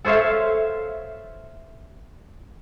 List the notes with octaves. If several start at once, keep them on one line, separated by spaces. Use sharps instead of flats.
A4 C5 C#5 E5 F5